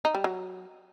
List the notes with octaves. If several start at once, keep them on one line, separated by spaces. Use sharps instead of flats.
D#4
G3
F#3